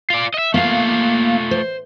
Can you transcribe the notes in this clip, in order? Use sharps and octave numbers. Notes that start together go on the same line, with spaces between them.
F4 D5
D#5 E5
A3 A#3 F4 F5
C5